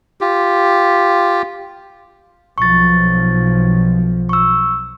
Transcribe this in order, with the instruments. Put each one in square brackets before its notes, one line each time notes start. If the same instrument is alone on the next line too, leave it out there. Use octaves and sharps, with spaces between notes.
[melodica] F4 G4
[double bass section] B1 F3 [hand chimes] C#6 A6
[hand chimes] C#6 E6